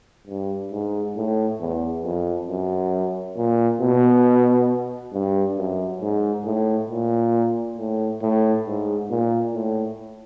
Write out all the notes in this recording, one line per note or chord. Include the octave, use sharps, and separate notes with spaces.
G2
G#2
A2
E2
F2
F#2
A#2
B2
G2
F#2
G#2
A2
A#2
A2
A2
G#2
A#2
A2